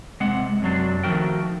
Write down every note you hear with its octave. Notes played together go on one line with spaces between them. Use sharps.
C3 G#3 C4 F#5
F#2 C3 F#3 D4
D#3 F3 A3 F#4 A#4 G5